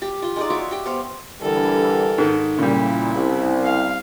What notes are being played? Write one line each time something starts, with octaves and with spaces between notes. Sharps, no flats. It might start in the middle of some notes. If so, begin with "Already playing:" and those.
G4
F4 C6
G#3 D#4 D5
F#4 C#5 E5 D6
G4 G5
B3 C5 F5
D3 E3 G3 A4 A#4
G#2 D#3
A#2 C#3 G3 E4
C2
F5